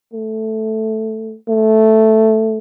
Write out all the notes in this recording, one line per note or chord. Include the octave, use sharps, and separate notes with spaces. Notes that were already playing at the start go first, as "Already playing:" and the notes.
A3
A3